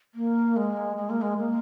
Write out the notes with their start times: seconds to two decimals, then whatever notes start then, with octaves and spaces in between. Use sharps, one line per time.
0.15 A#3
0.57 G#3
0.97 G#3
1.10 A#3
1.22 G#3
1.38 A#3